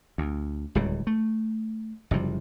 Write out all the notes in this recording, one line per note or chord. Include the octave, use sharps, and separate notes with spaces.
D2
D1 C#2 C#3 G3
A3
F#1 C3 F3 G3